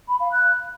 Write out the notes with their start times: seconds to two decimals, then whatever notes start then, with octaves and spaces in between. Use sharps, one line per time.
0.08 B5
0.20 F5
0.32 F#6